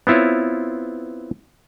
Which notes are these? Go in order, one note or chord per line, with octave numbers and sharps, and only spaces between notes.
B3 C4 E4 F4 C#5